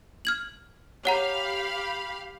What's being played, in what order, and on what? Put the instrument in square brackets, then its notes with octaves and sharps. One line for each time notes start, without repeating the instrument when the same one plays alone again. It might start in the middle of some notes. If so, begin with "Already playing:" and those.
[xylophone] F6 G#6 F#7
[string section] G4 F5 B5 [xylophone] C#5 F#5 A#5